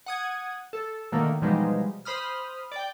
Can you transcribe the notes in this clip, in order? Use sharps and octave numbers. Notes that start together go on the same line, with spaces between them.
F#5 D#6 G#6
A4
B2 D3 D#3 A3 A#3
B2 E3 F3 G3 G#3 D#4
C5 B5 D#6 F6
D5 G5